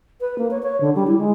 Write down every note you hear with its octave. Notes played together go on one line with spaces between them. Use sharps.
B4
A#3
C#5
C#5
D3
G3
E4
G#3